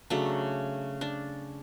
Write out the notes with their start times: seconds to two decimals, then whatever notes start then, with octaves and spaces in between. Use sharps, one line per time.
0.10 C#3 F#3 A3 D4
1.01 D4